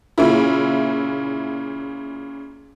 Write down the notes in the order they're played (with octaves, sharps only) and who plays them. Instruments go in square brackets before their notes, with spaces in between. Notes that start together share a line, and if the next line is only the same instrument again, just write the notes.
[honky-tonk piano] A#2 C#3 E4